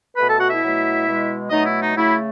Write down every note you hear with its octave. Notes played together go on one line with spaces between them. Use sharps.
B2 A3 B4 B5
A4 A5
F#4 F#5
E4 E5
B2 F#3 A3
B2 G#3
B2 F#3 A3 D#4 D#5
E4
D#4
C#3 F#3 A3 E4